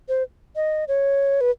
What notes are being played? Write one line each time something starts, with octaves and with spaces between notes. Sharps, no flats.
C5
D#5
C#5
B4